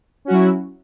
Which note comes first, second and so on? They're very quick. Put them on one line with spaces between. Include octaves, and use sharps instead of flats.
C#4 F#4 F#3 E4